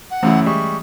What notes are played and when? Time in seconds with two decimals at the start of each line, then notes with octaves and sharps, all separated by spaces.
0.11 F#5
0.23 F#2 C#3 E3 A3 C#4 E4
0.46 G3 G#3 E5 C#6